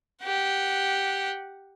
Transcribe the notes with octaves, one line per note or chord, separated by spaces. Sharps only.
G4 F#5